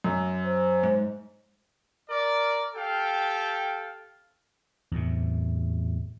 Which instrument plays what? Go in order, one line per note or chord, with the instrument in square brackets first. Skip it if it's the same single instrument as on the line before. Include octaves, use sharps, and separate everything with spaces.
[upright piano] F#2
[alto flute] C5
[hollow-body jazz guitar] G#2
[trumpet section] A#4 D5
G4 A4 F5 G5
[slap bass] E2 A2 C3